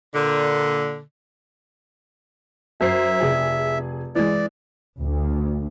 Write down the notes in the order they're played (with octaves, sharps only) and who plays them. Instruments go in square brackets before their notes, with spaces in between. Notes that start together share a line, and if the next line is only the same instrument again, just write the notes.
[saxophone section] A#2 D3
[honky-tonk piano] F#2 C5 C7 [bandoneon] E5
[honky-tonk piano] F1 G#4
[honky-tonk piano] E3 G#3 [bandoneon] D5
[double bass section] D2